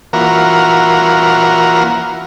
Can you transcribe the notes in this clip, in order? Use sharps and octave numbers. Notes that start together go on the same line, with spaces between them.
E3 A#3 F4 F#4 A#4